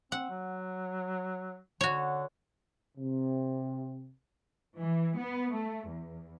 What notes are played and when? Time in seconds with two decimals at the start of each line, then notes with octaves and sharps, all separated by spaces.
0.12 C4 F#5
0.30 F#3
1.81 D3 F#4 C#5
2.97 C3
4.78 E3
5.19 B3
5.53 A3
5.89 E2